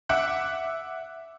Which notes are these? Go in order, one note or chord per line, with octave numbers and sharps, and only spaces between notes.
E5 F#5 D6 E6 F#6